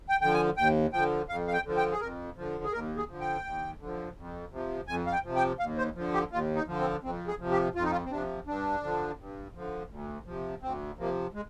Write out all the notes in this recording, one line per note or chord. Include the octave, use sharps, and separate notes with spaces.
G5
D3 F3 G5
G#5
D#2 G5
D3 F3 G5
F2 F5
F5
G5
D3 F3
G5
G#4
F2 A#4
D3 F3
G#4
D#2 A#4
G#4
D3 F3
G5
D#2
D3 F3
F2
C3 F3
F2 G#5
F5
G5
C3 F3
G5
D#2 F5
C5
D3 F3
G4
D#2 F4
D#4
D3 F3
C4
F2 C4
G#4
C3 F3
G4
F2 F4
D#4
F4
C4
C3 F3 D4
G2 D4
D3 F3
G2
D3 F3
D2
C3 F3
D2 C4
C3 F3 A#3
G#3